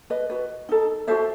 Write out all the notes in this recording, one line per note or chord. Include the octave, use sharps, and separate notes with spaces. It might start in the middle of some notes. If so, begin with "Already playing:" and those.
B4 D#5
F#4 B4
D#4 A4
F#4 A4 C5 E5